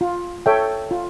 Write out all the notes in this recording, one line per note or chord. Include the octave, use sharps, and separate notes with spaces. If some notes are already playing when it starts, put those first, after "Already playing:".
F4
A4 C#5 E5 G5
F4